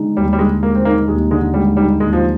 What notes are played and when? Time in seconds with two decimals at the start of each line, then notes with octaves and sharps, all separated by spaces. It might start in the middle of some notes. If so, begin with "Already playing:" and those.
Already playing: D3 G#3 D#4
0.17 D#2 G3
0.33 G3
0.39 D3 G#3
0.63 G#3 A#3
0.75 C4
0.85 A#3 D#4
1.08 D#2 G#3
1.31 D3 G#3
1.54 G3 G#3
1.77 G3 D#4
2.00 D#2 G#3
2.13 F3